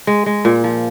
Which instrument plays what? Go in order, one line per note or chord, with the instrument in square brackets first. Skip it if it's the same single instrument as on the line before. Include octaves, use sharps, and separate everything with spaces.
[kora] G#3
G#3
A#2
F3